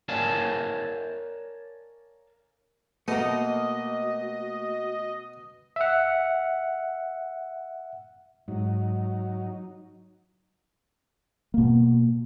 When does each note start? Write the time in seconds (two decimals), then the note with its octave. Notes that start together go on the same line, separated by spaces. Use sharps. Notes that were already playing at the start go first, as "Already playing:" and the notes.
0.09 A#4 C#5 D5 F5 G#5 A5
3.08 B2 A3 A#3 F#4 D#5
5.76 E5 F#5
8.48 G#2 F#3 D#4
11.54 B2 A#3